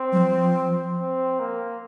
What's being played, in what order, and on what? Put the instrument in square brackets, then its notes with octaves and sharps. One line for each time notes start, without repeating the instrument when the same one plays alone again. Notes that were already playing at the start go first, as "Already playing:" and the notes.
Already playing: [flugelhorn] C4
[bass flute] F#3
F3
[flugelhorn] C4
A#3